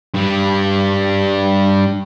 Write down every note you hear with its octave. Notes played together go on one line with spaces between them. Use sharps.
G2 G3